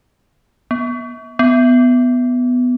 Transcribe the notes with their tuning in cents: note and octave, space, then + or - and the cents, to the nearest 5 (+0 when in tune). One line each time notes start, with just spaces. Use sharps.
B3 -30
B3 +10